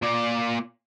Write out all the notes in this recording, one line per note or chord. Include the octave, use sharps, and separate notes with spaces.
A#2 D5